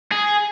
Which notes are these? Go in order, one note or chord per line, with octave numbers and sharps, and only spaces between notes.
G#4